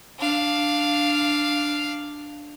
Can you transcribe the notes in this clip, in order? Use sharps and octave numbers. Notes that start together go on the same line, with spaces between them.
D4 F5